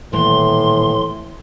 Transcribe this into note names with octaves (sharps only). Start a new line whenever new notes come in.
D#1 A2 E3 C6